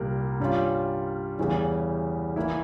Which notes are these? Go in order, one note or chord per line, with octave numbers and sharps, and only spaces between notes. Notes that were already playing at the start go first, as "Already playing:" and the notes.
Already playing: C2 A#2 G3 A#3
G2 G3 C#4 F4
E2 C#3 E3 G3
E3 A#3 E4